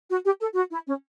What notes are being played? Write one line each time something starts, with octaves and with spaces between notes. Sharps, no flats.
F#4
G4
A4
F#4
E4
C#4